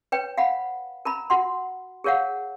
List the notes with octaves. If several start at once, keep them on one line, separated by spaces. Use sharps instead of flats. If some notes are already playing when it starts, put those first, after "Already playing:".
B4 C#5 G5
F5 F#5 B5
A#4 A#5 B5
F#4 F#5 C6
G#4 A#4 C#5 F5 F#5